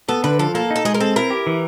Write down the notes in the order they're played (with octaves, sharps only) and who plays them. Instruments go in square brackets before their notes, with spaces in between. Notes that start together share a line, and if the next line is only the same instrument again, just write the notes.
[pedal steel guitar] B3 [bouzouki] A4
[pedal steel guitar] D3 [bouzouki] B4
[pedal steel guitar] F3 [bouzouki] A4
[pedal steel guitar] A#3 [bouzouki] A4
[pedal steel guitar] D#4
[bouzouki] A4
[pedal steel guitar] G#3 [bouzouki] G#4
[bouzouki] A#4
[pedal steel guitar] C4 [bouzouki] A4
[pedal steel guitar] E4 [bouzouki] A#4
[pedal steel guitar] G4
E3